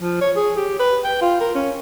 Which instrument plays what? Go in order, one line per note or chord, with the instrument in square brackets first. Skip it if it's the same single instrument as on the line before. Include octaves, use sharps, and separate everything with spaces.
[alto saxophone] F3
C#5
G#4
G4
B4
G5
F4
A#4
C#4